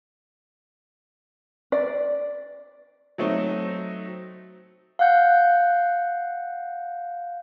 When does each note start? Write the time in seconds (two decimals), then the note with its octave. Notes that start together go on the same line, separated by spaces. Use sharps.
1.72 D5
3.18 F#3 A3 C4 D#4
4.99 F5 F#5 F#6 G6